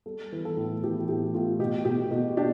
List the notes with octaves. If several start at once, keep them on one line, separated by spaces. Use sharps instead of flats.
G3 A4
E3
A4
A2
E3 G4
A2 G4
A2 F4
B2 G4
B2 G4
B2 G4
D4 G4